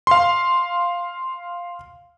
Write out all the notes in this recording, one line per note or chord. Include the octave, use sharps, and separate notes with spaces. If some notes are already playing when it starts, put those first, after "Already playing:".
F5 C6